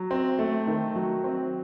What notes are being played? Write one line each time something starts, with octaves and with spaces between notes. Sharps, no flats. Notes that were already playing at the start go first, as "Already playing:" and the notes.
Already playing: F#3
C4
A3
D#3
F#3
C4